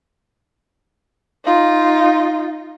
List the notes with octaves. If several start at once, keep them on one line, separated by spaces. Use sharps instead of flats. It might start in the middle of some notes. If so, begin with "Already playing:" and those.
D#4 F4